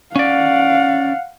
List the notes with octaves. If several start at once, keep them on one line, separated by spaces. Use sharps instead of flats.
C#4 D5 F5 F#5